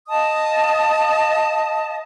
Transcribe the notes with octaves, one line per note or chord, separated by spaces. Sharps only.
D#5 F5 A5 D#6